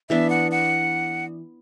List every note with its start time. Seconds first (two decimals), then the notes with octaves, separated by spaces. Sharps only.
0.09 E3 B3 D4 E5
0.30 F#5
0.51 F#5